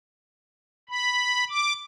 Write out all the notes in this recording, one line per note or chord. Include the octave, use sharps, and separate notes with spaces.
B5
D6